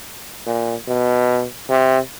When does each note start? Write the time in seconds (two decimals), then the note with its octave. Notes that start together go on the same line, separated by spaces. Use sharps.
0.46 A#2
0.88 B2
1.69 C3